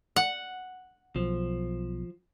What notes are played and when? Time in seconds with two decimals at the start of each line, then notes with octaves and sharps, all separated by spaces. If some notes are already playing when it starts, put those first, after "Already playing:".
0.16 F#5
1.16 B1 F3